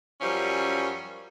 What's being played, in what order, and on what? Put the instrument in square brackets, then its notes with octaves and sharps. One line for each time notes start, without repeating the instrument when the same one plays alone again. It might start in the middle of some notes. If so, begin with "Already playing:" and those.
[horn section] F#2 F3 G3 C#4